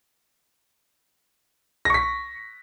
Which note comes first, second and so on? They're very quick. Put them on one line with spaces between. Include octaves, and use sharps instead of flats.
A#6 C#6 B6